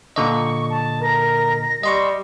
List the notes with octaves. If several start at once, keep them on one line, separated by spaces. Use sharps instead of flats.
A#2 D3 D#5 C#6
A5
A#4 A#6
G3 D#5 C6 C#6